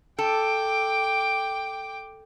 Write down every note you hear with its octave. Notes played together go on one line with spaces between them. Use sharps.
A4 G5 D6